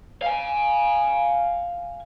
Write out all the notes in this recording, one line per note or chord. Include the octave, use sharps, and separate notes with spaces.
F5 G#5